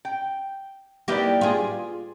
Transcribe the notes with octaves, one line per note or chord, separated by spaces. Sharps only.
G5
A#3 D#4 E4 G4 B4 D5
F4 G#4